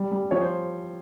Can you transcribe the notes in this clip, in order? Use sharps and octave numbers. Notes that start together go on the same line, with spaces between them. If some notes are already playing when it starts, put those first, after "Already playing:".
Already playing: G3
G3
F3 C#5
C5